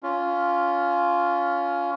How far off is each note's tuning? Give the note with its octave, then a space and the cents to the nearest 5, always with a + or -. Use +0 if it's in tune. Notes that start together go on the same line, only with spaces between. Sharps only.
C#4 +20 F4 +0